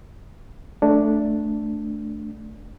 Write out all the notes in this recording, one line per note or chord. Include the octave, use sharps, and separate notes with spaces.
A3 D4